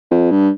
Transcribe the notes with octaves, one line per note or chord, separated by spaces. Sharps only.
F2
G2